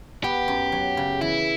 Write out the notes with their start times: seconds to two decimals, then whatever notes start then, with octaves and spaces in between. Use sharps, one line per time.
0.24 B3 G4
0.48 F#2
0.72 F#3
0.97 C#3
1.21 E3 E4